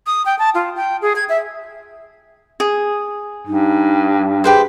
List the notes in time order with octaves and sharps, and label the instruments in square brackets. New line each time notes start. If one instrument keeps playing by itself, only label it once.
[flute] D#6
G5
A5
F4
G5
G#4
G#6
E5
[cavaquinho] G#4
[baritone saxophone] G2 [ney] D#4
[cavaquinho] G4 B4 C5 [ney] G#4